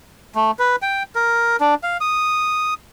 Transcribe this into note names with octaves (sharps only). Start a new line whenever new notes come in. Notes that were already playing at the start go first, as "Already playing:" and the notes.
A3
B4
G5
A#4
D4
F5
D#6